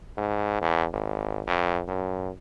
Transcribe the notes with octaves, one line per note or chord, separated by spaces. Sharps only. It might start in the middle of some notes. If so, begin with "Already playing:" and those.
G#2
E2
G#1
F2
F#2